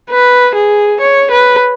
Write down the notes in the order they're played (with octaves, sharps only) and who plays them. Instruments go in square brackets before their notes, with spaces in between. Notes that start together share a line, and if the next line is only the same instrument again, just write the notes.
[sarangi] B4
G#4
C#5
B4